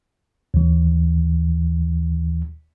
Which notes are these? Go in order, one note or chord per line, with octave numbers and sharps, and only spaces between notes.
D#2 E3